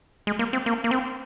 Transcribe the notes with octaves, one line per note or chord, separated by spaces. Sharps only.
G#3
A#3
C4
A#3
A#3
C4